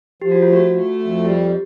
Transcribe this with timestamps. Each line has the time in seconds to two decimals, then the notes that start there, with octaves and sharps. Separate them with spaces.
0.22 F3 G4
0.32 F#4
0.42 F4
0.48 A3
0.53 F#4
0.73 A3
0.99 F2
1.24 G3 G4